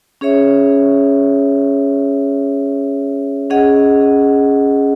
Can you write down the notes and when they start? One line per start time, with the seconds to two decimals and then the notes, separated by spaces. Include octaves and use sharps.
0.21 C#4 G#4 C#5 E5
3.50 C#4 G#4 D#5 F#5